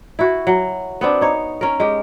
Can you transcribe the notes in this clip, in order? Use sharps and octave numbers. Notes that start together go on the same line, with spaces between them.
E4 F#4
F#3
B3 C4 D4
D#4 C#5
C#4 A#4
G#3 G4